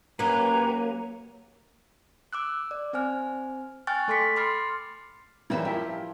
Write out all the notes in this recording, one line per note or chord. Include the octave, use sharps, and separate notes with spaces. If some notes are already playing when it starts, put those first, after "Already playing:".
F#3 A#3 C#4 G4 B4 G#5 A#5
D6 E6 F#6
D5
C4 C5 G#5 F6
G5 G#5 C#6 F6 F#6 A6
A3 A4 C6 D6 B6 C#7
B5 C6 D6 F6 A6 C7
F#2 E3 G3 C#4 E5
F3 E4 G4 A#4